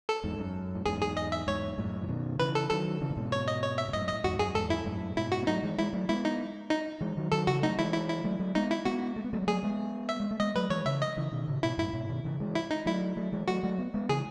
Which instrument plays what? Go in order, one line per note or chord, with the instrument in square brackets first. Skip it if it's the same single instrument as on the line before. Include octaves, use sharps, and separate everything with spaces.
[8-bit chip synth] A4
[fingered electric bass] E2 G#2
F#2
A2
[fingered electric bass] E2 G#2 [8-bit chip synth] G#4
[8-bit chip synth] G#4
D#5
E5
[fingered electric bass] E2 G#2 [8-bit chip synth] C#5
[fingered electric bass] F#2 A2
E3
B2 D#3
[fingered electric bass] C#3 E3 [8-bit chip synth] B4
[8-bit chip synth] A4
[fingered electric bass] D#3 F#3 [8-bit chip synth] A4
[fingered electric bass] C#3 E3
A2
G#2 B2
[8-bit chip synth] C#5
D#5
C#5
E5
[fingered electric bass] B2
[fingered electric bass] F#2 A2 [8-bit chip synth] D#5
[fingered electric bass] A2 [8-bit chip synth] D#5
[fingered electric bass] E2 G#2 [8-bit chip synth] F#4
[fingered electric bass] F#2 [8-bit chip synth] G#4
[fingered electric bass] E2 G#2 [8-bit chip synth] A4
[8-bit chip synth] E4
[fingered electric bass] F#2 A2
[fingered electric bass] G#2 B2 [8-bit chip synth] E4
[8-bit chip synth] F#4
[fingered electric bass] B3
[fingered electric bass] F#3 A3 [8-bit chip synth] D#4
[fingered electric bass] E3 G#3
[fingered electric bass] E3 G#3 [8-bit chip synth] E4
[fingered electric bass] F#3 A3
[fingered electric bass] G#3 B3 [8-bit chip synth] E4
[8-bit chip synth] D#4
D#4
[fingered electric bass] E3 G#3
D#3 F#3
[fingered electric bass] D#3 F#3 [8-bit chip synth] A4
[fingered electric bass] C#3 E3 [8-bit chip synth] F#4
[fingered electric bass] F#3 A3 [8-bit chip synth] D#4
[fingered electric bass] E3 G#3 [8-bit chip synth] E4
[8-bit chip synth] E4
E4
[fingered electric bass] F#3 A3
F#3 A3
[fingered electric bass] G#3 B3 [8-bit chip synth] D#4
[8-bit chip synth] E4
[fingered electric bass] G#3 B3 [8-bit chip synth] F#4
[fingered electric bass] A3
B3
F#3 A3
G#3
[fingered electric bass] F#3 A3 [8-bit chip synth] G#4
[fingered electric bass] G#3 B3
[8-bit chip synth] E5
[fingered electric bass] G#3
A3
[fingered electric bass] G#3 B3 [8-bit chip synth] D#5
[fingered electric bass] F#3 A3 [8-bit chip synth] B4
[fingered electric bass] E3 G#3 [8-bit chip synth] C#5
[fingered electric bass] C#3 E3 [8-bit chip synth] E5
[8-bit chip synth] D#5
[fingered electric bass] C#3 E3
B2 D#3
A2 C#3
[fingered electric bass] G#2 B2 [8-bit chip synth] E4
[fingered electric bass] F#2 A2 [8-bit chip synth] E4
[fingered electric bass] G#2 B2
B2 D#3
C#3 E3
E3 G#3
[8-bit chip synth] E4
D#4
[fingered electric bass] F#3 A3 [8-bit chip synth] E4
[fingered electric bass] F#3 A3
E3 G#3
[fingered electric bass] F#3 A3 [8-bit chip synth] F#4
[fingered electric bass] F#3 A3
B3
G#3 B3
[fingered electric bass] C#3 E3 [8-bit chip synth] G#4